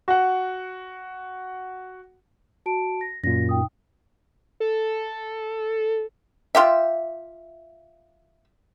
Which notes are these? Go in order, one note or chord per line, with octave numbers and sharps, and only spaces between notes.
F#4 F#5
F#4 A5 D7
A#6
F#2 A#2 A#6
D#4 G5 D#6
A4
F4 G4 E5